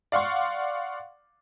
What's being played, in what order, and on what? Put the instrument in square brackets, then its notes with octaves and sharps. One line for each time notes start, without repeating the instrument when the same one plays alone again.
[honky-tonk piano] D5 F5 F#5 C6 C#6